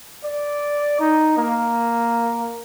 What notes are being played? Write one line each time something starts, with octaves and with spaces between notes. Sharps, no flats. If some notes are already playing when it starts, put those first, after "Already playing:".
D5
D#4
A#3